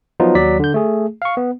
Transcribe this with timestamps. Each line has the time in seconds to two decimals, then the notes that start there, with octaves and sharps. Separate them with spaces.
0.20 F3 F#3 B3 D#4 F4
0.35 D#2 F#3 D5 B6
0.59 D3 G6
0.74 A3 G#4
1.22 F5 C#6
1.37 B3